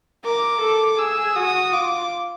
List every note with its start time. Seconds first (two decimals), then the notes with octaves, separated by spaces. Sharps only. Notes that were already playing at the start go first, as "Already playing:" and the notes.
0.24 A#4 D6
0.61 A4
0.98 G#4 E6
1.35 F#4 D#6
1.73 F4 D6